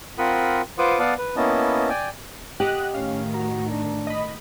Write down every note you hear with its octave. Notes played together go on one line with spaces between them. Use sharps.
C4 F4 A#4 F#5 B5 D#6
F4 B4 C5 F#5 D6 D#6
B3 D5 F5 F#5 A5 D#6
B4
A#3 B3 C#4 E4 D#5 A5
D5 G5 G#5
G4 D#5 F#5 F#6
A2 D#3 C#4 F5
F#4 A#5
D4
D#5 B5